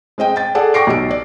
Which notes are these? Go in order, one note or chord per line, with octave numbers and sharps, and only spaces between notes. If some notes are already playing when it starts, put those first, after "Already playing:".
G#3 C4 D#5 G5
G5 A6
G#4 A4 D5 F#5 A5
G5 C#6 D6 A#6 C7 D7
B1 G4 D7
D5